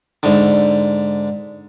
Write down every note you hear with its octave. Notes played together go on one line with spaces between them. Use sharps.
G#2 D3